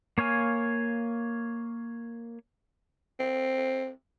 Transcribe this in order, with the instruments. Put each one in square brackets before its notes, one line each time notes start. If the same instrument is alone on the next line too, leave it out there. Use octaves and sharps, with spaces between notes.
[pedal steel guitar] A#3 C#5 F5 G#5
[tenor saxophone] C4